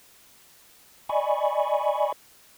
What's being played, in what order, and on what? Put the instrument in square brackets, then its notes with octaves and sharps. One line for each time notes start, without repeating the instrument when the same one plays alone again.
[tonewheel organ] D5 D#5 G#5 B5 C#6